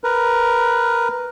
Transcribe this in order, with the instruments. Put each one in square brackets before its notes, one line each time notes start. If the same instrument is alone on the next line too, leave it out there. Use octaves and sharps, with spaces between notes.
[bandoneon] A#4 B4